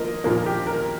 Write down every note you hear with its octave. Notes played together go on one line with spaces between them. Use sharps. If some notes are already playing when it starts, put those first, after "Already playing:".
Already playing: F3 A#3 A#4 D#5
A#2 F3 A#3 A#4
G4
A#4